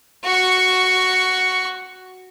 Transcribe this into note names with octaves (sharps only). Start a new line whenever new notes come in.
F#4 C#6